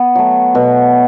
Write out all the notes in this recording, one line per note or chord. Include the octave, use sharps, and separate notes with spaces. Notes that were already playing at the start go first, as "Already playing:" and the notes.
Already playing: B3
F#3 A3
B2